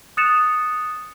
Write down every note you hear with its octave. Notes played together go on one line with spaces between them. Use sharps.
D#6 F#6 A6 C#7 E7 F7